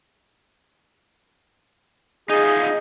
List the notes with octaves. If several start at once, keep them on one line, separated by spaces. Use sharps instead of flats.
D#4 F4 G#4